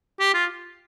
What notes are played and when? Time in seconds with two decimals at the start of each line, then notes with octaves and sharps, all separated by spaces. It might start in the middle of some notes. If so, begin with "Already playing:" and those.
0.20 G4
0.34 F4